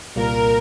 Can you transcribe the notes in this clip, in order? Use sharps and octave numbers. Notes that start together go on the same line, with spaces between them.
C2 A#2 G3 A#3 A#4